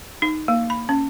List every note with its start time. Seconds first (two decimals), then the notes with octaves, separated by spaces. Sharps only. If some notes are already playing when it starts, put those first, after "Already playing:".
0.22 D#4
0.48 A#3
0.70 B5
0.89 C#4